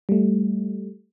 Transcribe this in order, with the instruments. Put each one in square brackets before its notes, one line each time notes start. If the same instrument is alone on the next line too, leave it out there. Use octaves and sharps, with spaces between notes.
[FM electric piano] G3 A3